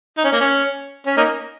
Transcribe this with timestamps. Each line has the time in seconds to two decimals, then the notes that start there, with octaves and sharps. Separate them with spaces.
0.18 D#4
0.24 C#4
0.33 A#3
0.40 C#4
1.06 C#4
1.17 A#3 D#4